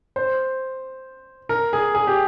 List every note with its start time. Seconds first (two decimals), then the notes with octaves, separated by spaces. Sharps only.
0.16 C5
1.49 A#4
1.73 G#4
1.95 G#4
2.07 G4